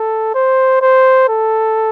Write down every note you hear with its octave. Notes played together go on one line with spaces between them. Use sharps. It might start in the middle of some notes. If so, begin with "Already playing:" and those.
Already playing: A4
C5
C5
A4